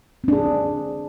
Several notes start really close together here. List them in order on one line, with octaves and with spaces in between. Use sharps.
C4 D4 G#4